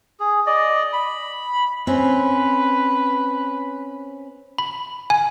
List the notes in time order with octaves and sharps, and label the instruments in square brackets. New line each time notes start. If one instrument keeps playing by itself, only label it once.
[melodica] G#4
D5 D#5
B5
[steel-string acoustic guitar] C4 C#4 [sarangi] B4
[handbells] B5
G#5